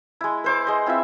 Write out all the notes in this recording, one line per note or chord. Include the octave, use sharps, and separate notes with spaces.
G#3 E4
B4 C5 D6
G#3 D#5
C4 E4 F4 E5